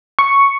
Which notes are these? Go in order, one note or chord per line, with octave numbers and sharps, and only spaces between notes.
C#6